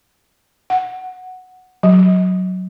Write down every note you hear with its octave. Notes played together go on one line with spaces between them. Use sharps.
F#5
F#3